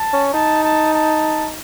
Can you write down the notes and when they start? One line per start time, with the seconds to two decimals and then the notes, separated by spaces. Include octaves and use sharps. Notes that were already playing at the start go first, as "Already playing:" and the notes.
Already playing: A5
0.13 C#4
0.33 D#4 A5
0.64 A5
0.94 A5